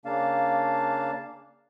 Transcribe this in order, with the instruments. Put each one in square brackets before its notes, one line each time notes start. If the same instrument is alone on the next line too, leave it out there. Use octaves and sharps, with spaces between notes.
[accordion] C#3 A#3 D4 F5 A5